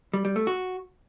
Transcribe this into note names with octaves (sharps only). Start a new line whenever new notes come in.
G3
G3
A3
F#4